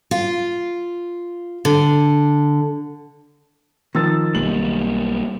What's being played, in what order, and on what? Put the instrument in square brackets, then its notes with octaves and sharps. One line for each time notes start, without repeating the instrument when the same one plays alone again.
[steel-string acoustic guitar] F4
D3
[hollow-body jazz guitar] D#3 [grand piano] F3 E6 A6
[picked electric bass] B1 G3 A#3 [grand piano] F#7